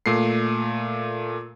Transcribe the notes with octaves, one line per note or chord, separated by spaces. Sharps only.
A#2 A3 C7